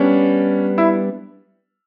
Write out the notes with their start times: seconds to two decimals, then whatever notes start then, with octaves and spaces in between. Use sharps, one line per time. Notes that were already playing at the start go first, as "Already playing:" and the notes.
Already playing: G3 B3 C#4 D4
0.78 E4